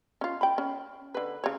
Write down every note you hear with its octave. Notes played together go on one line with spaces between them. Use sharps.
C#4 F4
G5 B5
C#4
D3 B4
C#3 C#5